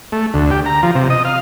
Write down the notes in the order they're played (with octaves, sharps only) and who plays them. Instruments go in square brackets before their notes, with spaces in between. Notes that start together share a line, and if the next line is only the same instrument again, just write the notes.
[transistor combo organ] A3
D2
G4
A#5
F3
C3
D#5
F5